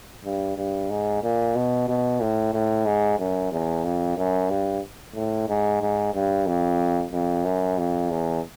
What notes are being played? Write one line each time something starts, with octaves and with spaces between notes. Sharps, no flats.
G2
G2
G#2
A#2
B2
B2
A2
A2
G#2
F#2
E2
F2
F#2
G2
A2
G#2
G#2
G2
F2
F2
F#2
F2
E2